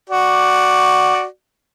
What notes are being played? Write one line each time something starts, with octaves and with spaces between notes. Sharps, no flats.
F#4 D5